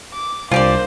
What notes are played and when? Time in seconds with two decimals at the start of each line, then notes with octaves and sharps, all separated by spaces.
0.14 D6
0.51 C2 A#3 D4 F4 G4 C5 D5